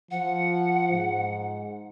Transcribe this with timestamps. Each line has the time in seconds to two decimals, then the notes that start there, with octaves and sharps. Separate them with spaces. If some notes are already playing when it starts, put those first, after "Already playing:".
0.11 F3 F#5
0.91 G#2